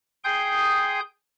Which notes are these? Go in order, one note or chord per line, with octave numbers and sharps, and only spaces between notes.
G#4 G5 C6 D#6 G6